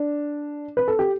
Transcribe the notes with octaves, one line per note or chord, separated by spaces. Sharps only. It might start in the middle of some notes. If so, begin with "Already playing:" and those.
Already playing: D4
B4
A4
G4